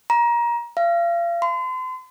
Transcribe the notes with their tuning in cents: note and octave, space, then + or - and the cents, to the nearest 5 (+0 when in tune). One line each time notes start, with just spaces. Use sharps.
A#5 +25
F5 -35
C6 -40